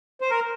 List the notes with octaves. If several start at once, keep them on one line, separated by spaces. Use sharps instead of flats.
C5
A#4